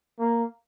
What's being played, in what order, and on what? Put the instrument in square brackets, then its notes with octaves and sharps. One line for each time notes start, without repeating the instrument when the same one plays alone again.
[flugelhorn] A#3